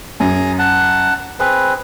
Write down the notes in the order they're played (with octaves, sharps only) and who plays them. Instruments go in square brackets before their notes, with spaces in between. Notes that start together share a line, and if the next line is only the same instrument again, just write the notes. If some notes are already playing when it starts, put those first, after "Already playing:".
[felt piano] F#2 [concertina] G#4 G#5 A#5
[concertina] F#5 A5
[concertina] C4 G#4 B4 [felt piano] B5